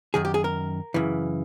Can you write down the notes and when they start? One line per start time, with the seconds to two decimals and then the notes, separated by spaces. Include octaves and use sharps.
0.14 F#2 D#3 G#4
0.25 G4
0.34 G#4
0.44 A#4
0.94 F#2 C#3 E3